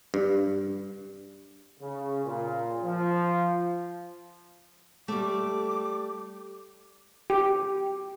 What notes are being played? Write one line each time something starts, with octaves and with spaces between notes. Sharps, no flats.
G2
C#3
A#2
F3
G3 A3 D6
G4